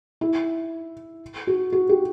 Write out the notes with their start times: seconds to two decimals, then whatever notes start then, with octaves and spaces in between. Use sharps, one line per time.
0.21 E4
1.47 F#4
1.72 F#4
1.89 G4